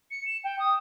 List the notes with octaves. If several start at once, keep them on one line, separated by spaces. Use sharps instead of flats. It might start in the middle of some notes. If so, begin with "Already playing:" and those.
C#7
E7
G5
D#6